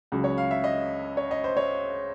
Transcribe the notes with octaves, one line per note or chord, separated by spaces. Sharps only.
C#2 C#3 F#3
C#5
F5
E5
D#5
C#5
D#5
C5
C#5